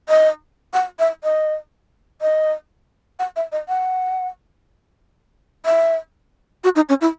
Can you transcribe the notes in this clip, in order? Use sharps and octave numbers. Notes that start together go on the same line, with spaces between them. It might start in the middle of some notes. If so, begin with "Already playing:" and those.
D#5
F#5
E5
D#5
D#5
F#5
E5
D#5
F#5
E5
F#4
D#4
C#4
E4